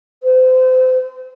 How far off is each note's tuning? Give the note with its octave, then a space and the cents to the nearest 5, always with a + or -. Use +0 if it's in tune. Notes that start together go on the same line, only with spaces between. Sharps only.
C5 -30